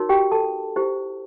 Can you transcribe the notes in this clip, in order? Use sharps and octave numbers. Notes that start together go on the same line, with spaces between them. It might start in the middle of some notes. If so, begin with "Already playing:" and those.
Already playing: D#4 F#4 A#4 C#5
G4 G5
A4 A5
E4 G4 C5